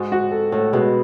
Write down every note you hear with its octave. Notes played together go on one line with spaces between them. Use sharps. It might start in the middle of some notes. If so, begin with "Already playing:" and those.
Already playing: G#2 F#4
F#4
A4
A2 A4
B2 G#3